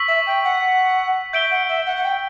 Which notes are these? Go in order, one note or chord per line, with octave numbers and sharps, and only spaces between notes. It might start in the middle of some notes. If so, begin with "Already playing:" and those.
Already playing: C#6 E6 B6 F#7
E5
G5
F#5
E5 G6 D7 G7
F#5
E5
F#5
F#5
G5